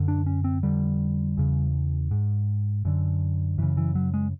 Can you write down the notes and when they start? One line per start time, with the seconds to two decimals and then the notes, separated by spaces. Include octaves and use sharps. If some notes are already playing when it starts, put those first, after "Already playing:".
Already playing: F#2 D3
0.08 D4
0.26 C#4
0.44 C4
0.63 F2 D3 G3
1.37 E2 C#3
2.11 G#2
2.85 F#2 D3
3.58 F#2 C#3 E3
3.77 E3
3.95 F#3
4.14 G#3